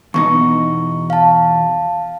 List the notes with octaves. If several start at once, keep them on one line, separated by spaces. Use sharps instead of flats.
E2 B2 D#4 C#6
F5 A5